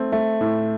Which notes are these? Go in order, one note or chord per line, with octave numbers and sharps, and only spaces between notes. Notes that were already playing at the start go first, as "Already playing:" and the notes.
Already playing: A3 C4
A3
A2